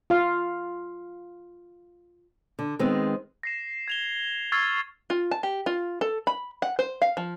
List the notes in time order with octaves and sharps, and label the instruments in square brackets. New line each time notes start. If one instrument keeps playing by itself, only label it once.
[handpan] F4 F5
[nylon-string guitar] D3
D#3 G#3 B3 C4
[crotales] A#6 C7 E7
G#6 F7 G7
C#6 E6 F6 G#6 A6 C7
[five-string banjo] F4
A5
G4
F4
A4
B5
F#5
C5
F5
F3